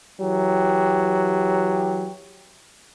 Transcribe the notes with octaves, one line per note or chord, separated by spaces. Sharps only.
E3 F#3 G4